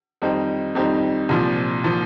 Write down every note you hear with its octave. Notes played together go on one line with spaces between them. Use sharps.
F2 D#3 G3 D#4 C5
F2 D#3 G3 D#4 C5
C2 A#2 F3
A#2 F3